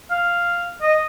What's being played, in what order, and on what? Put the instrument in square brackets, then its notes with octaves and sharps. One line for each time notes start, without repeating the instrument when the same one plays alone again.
[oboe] F5
D#5